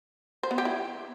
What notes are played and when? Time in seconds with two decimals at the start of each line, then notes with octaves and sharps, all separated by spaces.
0.43 C5
0.51 B3
0.58 G4
0.65 E4